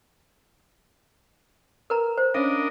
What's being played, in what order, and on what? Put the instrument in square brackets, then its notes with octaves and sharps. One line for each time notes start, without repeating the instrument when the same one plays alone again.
[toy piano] A#4 B4 A#5
C5
[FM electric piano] C#4 B5 [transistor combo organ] D4 A#4 D#5 [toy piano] F5